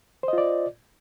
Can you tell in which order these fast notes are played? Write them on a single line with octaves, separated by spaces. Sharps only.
C5 D#5 F4 D5